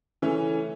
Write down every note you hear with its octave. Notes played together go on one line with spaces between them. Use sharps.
C#3 E3 A3 C#4